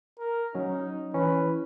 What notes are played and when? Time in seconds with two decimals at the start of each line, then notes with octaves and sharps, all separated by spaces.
0.19 A#4
0.55 F#3 C#4 D#4
1.14 E3 C#4 B4